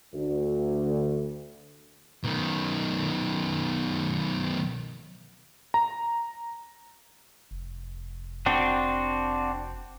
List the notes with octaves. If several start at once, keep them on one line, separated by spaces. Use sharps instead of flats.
D2
B1 D#3
A#5
F1
C4 D4 F#4